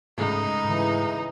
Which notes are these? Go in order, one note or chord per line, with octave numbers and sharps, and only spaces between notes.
C#2 G#2 G#3 A3 D#4
G#2 C#3 E3